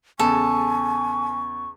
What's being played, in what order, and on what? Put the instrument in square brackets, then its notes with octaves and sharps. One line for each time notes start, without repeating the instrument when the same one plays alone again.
[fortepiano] E2 C#3 [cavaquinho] A4 [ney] G#5 [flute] C#6